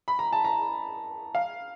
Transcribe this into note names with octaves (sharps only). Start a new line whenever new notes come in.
B5
A#5
A5
A#5
F5